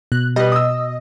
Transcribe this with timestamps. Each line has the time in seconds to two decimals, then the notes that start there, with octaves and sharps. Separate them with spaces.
0.12 B2 F#6
0.36 G3 B4 D#5
0.52 D#6 E6